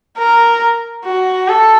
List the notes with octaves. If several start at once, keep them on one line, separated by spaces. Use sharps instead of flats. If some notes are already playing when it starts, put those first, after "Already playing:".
A#4
F#4
A4